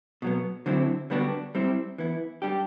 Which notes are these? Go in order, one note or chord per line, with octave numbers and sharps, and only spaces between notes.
B2 F#3 B3
D3 F#3 C4 E4
D3 G3 B3 D4 F#4
G3 C4 E4
E3 B3 E4
G3 D4 G4